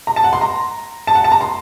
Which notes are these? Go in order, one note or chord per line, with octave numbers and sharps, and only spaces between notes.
A#5
A5
F#5
C6
A#5
A5
F#5
A5
A#5
C6